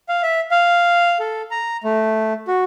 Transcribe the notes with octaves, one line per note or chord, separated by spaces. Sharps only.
F5
E5
F5
A4
A#5
A3
F#4